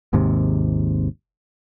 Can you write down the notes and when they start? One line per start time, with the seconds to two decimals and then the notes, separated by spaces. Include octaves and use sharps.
0.13 G#1 D#2 G#2 C3